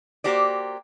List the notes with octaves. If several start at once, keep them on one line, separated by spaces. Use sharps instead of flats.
A#3 F#4 G4 C5 D5